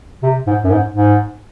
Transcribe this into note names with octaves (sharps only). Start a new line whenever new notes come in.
C3
G#2
F#2
G#2
G#2